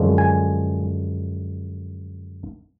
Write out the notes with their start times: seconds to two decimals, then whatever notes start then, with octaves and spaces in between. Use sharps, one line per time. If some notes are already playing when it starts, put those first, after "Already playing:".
Already playing: F#2 D3 F3 G#3
0.18 G#5